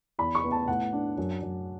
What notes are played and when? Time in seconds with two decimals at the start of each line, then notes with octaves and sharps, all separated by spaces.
0.19 E2 B5
0.35 C#6
0.44 B3
0.52 A5
0.68 A2 F#5
0.93 D4
1.18 F#2
1.42 F#2